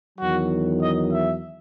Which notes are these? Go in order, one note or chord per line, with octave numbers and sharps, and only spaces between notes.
E2 D#3 F#3 F#4
D#5
E5